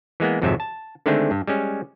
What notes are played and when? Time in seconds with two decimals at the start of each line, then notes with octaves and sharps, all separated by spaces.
0.20 E3 G#3 A#3 B3
0.42 G#1 F2 G#2 C3 F#3 E5
0.60 A5
1.06 D3 D#3 G#3 A3 C4 D4
1.31 G2
1.47 G3 G#3 C#4